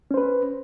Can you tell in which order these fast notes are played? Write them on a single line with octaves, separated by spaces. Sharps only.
C#4 C5 B4